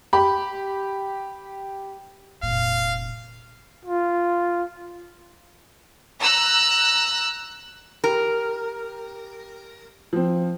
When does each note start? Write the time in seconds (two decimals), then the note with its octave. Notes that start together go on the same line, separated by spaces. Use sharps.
0.13 G4 B5
2.43 F1 A#2 F5
3.85 F4
6.20 A#5 E6 F#6
8.04 G4 A#4
10.13 F3 C4